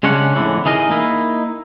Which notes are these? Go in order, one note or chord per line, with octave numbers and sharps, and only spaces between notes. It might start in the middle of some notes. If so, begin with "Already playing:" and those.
C#3 G#3 C#4 D4 F#5
F2 A2 D3 E3
E3 D#4 G#4 A#4 D#5
A#3 D#4 E4